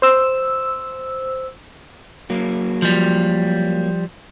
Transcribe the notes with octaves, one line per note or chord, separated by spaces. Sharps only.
C5 E6
F#3 A#3
F3 G3